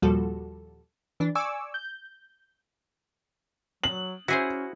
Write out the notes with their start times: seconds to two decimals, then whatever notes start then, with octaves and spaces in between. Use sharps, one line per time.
0.02 D#2 A#2 F3 G3 F#4 A4
1.20 E3 D4
1.35 D5 G#5 C#6 D6 E6
1.74 G6
3.84 F#3 F#7
4.28 C#4 E4 F#4 G#4 C5